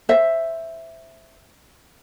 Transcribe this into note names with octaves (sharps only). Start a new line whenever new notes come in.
C5 E5